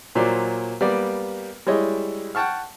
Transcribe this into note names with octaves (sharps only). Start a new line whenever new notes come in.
A#2 F#3 C5 D5
G3 A#3 B3 D5
G3 G#3 E4 C#5 D#5
F#5 G5 A5 C#6 F6